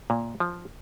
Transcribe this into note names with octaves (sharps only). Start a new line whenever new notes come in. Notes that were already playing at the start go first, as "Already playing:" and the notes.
A#2
F3